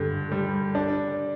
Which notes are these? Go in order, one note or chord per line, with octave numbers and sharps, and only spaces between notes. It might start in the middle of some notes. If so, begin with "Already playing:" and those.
Already playing: G2 D3
G3
D4